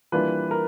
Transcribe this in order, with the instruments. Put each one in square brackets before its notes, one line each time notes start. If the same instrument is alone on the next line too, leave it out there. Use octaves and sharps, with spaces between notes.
[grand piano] E3 G3 A#3 D4 F4 [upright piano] B4
[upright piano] A#4